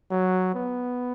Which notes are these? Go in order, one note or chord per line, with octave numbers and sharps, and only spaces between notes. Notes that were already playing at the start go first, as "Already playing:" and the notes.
F#3
B3